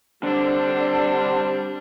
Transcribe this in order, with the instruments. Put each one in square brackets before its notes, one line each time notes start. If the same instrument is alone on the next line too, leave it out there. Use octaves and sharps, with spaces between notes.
[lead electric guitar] D3 [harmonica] G3 C4 [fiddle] D4